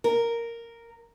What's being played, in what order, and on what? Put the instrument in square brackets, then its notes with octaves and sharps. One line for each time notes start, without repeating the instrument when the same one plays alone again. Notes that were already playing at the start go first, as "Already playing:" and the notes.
[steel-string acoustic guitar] A#4